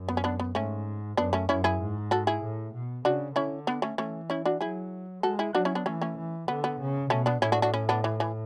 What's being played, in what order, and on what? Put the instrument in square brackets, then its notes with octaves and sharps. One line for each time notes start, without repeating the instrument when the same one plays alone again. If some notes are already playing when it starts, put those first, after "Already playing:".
Already playing: [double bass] F#2
[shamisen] B3
C#4
B3 D4
B3
[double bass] G#2 [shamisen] A3 C#4
[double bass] F#2 [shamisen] B3 D4
[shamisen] A3 C#4
[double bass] F#2 [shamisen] C#4 E4
[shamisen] E4 G#4
[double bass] G#2
[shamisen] F#4 A4
E4 G#4
[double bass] A2
B2
[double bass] C#3 [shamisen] D4 F#4
[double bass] D3 [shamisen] C#4 E4
[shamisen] B3 D4
A3 C#4
[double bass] E3 [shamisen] A3 C#4
[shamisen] C#4 E4
D4 F#4
[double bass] F#3 [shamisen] E4 G#4
[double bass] G#3 [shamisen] F#4 A4
[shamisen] E4 G#4
[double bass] F#3 [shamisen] D4 F#4
[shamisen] C#4 E4
B3 D4
[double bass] E3 [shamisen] A3 C#4
[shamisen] A3 C#4
[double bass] E3
[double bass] D3 [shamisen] B3
[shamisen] B3
[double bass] C#3
[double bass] B2 [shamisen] A3 C#4
[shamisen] B3 D4
[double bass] A2 [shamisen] C#4 E4
[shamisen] D4 F#4
D4 F#4
C#4 E4
B3 D4
E3
E3